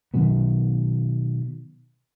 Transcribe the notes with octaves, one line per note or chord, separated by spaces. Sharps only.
B2 D#3 F#3 B3